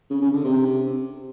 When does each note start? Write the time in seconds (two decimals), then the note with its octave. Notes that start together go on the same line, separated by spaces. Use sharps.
0.10 C#3
0.22 C#3
0.33 D3
0.44 C3